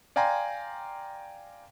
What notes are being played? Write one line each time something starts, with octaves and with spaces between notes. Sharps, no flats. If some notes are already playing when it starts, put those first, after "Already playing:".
D5 F5 G5 G#5 A#5 C6